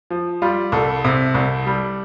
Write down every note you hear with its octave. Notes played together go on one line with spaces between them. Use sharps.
F3
G3 F4
C2 A4
C3
C2
G3